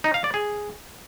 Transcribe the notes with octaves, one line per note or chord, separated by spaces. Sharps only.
D#4
F5
D5
G#4